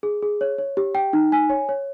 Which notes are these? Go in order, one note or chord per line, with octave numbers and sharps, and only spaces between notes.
G#4
G#4
C#5
C#5
G4
G5
D#4
G#5
C#5
C#5